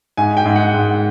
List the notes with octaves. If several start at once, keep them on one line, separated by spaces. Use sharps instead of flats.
G#2 G#5
G5
G#2
F#5
G#2